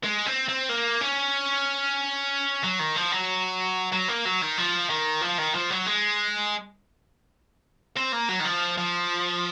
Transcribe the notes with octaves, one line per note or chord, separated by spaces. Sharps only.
G#3
C4
C4
A#3
C#4
F#3
D#3
F3
F#3
F#3
A#3
F#3
D#3
F3
D#3
F3
D#3
F3
F#3
G#3
C4
A#3
F#3
D#3
F3
F3